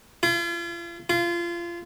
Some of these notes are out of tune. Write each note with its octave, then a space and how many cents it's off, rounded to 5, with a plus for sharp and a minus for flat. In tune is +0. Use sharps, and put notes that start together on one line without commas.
F4 -40
F4 -25